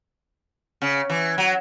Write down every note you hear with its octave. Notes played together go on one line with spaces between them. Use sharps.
C#3
E3
F#3